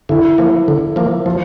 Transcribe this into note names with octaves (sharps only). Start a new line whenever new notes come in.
D3 E4
F3 A#3
D3
F3 A#3
F3 F4